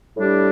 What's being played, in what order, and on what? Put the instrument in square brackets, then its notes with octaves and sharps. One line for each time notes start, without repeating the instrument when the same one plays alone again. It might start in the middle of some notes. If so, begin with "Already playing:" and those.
[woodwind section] A2 G3 D4 G4